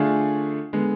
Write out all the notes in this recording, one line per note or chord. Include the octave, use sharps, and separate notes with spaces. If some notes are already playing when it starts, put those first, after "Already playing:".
Already playing: D3 A3 D4 F4 G#4
D3 G#3 B3